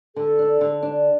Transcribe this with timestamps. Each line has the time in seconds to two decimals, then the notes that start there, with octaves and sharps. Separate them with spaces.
0.16 D3 A4
0.39 D4
0.61 D3
0.83 D4